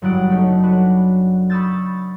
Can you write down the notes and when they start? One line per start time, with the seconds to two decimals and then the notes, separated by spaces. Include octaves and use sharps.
0.02 F#1 F#3 G3 F#5 D#6 D7
0.30 A3 C#4 D#4
0.63 D4 F#4 B4
1.50 B5 C#6 D#6 E6 G6 A6